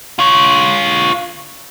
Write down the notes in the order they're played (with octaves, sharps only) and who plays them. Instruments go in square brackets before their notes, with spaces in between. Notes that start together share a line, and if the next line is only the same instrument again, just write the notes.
[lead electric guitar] F4 C#5